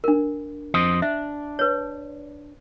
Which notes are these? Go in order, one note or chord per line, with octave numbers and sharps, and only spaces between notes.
D4 A#4
F2 C5 D#5
D4 E5
B4 C#5